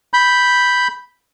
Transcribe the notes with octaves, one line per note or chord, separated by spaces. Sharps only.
B5 G6